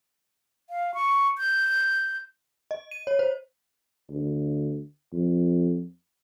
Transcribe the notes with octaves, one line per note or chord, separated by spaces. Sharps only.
F5
C#6
G6
D#5
D#7
C#5
C5
D2
F2